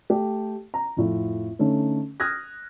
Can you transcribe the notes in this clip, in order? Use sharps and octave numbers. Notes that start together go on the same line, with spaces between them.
A3 G4
A#5
F2 A2 F4
D3 A3 C#4 D#4
D#6 F6 F#6 G#6 A#6